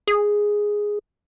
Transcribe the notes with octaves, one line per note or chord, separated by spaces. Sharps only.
G#4